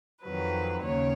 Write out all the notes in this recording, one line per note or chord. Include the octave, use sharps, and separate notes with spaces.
F2 D#3 F#3 B4
D#2 C#3 C#5